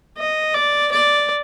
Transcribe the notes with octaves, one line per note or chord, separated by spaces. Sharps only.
D#5
D5
D5